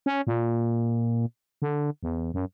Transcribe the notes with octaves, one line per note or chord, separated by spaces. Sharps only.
C#4
A#2
D3
E2
F#2